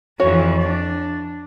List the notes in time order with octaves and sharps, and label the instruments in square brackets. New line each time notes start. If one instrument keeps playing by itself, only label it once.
[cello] F2 E3 [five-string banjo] F#4 C#5
[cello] D4